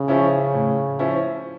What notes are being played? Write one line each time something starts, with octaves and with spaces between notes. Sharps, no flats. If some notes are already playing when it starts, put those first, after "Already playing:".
Already playing: C#3
F3 C#4 E4
A2
F3 C#4 E4